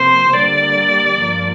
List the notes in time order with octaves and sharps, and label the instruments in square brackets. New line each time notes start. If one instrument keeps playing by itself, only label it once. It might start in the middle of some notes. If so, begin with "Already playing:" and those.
Already playing: [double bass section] C3 F3 A#3 [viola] C5
[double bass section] D3 G3 A#3 [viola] D5
[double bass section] G2 F3 A#3